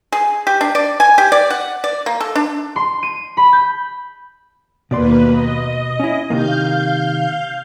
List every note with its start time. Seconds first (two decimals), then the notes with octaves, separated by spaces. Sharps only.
0.12 G#4
0.47 G4
0.61 D4
0.75 D5
1.00 G#5
1.18 G4
1.32 D5
1.50 F#5
1.84 D5
2.06 A#3
2.20 A4
2.35 D4
2.76 C6
3.03 D#7
3.37 B5
3.53 G6
4.91 D#2 B2 A#3 B4 D5 C6
5.32 D#5
6.00 C#4 E4
6.30 C3 D#3 A#3 F5 G6